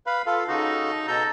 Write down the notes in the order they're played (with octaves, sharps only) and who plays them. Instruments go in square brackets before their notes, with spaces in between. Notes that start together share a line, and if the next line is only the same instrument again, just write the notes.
[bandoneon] B4 F5 B5
F4 A4 F5
[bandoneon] C#3 F#4 A4 [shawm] D#4
[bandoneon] B2 A#5 G6 [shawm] A4